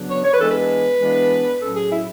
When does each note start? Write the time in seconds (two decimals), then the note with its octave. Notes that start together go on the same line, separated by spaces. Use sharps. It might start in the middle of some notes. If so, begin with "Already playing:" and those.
Already playing: C#3 F#3 B3 D4
0.08 C#5
0.24 C#5
0.32 B4
0.39 E3 G#3 B3 D4 A4
0.50 B4
1.00 E3 G#3 B3 D4
1.61 A2 F#3 C#4 A4
1.76 G#4
1.91 E4